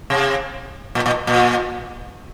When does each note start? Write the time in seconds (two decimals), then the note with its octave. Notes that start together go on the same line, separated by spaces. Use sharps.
0.10 C3
0.95 A#2
1.06 A#2
1.27 A#2